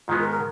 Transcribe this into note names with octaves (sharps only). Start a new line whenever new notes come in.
G#2 D#3 G#3 B3 F4
A#4
A#4